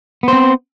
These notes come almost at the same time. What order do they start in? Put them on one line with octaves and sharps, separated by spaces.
B3 C5 C4